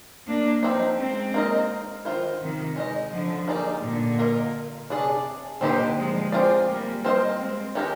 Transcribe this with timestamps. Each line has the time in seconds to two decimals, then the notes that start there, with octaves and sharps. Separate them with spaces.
0.26 A#3 D4
0.63 F3 C4 D#4
0.99 G#3 C4
1.34 A#3 D#4 A#4 D#5
2.05 D#3 A#3 F4 C5
2.41 C3 D#3
2.76 G#3 D#4 A#4 D#5
3.11 D3 F3
3.48 G3 A#3 D#4 G#4 D5
3.83 A#2 D3
4.19 A#3 F4 A#4 D#5
4.90 C3 D4 G#4 D5
5.61 A#2 D3 C4 D#4 G4 C5
5.97 F3 G#3
6.32 C4 F4 G#4 D5
6.68 G3 A#3
7.05 C4 F4 C5 D#5
7.40 G#3 C4
7.75 D#3 G#3 D#4 G4 A#4